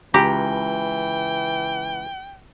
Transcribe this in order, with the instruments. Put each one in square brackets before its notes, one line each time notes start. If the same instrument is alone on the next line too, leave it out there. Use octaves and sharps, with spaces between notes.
[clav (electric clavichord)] C#2 A#5 [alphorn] E3 [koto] G4 [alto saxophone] G5